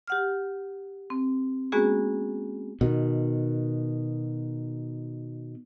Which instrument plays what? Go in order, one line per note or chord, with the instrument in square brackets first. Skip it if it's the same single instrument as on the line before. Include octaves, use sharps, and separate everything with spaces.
[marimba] G4 F#5 F6
C4
G#3 A#3 B3 C#4 F#4 G#4
[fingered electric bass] B2 D#3